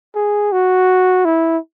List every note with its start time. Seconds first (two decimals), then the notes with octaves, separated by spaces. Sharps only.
0.15 G#4
0.52 F#4
1.25 E4